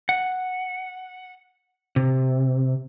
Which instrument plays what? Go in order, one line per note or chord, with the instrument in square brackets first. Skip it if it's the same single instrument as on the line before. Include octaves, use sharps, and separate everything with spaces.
[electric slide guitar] F#5
C3